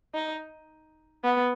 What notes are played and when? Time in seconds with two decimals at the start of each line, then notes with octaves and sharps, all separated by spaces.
0.14 D#4
1.24 B3